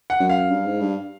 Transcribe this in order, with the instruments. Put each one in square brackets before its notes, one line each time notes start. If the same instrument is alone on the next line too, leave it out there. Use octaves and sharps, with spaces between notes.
[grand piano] F#5
[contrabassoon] F#2
[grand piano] F5
[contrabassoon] G2
G#2
G2